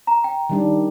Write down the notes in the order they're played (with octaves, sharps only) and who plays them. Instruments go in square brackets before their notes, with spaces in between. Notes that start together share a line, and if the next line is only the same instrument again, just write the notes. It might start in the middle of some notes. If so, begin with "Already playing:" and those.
[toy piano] A#5
G5
[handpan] D#3 G3 D4